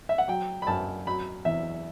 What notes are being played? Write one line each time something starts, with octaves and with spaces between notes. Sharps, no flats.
E5
F#5
F#3 G5
B5
F#2 A5
F#3 B5
E2 E5